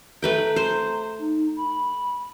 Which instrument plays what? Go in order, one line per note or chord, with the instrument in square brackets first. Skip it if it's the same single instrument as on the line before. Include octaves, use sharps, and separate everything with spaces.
[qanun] A3 B4 G5 [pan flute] A#5
[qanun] C5
[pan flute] D#4
B5